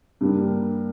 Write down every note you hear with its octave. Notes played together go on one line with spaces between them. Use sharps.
G2 G3 A#3